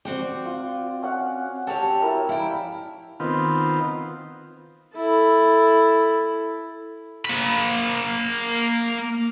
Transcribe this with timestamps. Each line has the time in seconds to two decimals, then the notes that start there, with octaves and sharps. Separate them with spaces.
0.05 C4 F#4 D5 G5
0.46 F4
1.02 C#4 F5 F#5
1.67 F#4 G4 C#5 G5 A5 E6
2.00 E4 A#4 E6
2.29 G3 E4 F5 G5
3.20 D#3 B3 C4 F4
4.96 E4 A4
7.25 A#3 B5